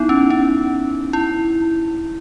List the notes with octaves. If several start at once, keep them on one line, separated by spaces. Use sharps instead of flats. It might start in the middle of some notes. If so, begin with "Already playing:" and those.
Already playing: B3 D#4 E4
C#4
C#4
E4